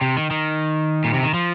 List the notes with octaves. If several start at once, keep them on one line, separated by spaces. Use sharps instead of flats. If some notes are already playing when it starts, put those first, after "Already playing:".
C3
D#3
D#3
A#2
C3
D#3
F3